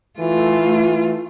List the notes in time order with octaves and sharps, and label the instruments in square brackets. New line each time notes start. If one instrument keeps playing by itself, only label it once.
[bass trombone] E3 [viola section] A3 [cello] F4